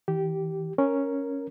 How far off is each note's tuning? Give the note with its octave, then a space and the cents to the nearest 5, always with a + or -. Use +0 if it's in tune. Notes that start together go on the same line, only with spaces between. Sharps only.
E3 -40 G4 -15
C#4 +0 A#4 +0